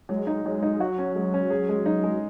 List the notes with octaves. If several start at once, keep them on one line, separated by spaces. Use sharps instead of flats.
F#3 G#3
D#4
F#3 G#3
D#4
F#3 F#4
C#4
G#3
C#4
G#4
G#3
D#4
G#3